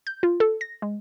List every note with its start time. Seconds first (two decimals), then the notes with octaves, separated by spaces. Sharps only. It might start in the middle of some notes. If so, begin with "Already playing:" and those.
0.07 G6
0.23 F4
0.40 A4
0.61 A#6
0.82 G#3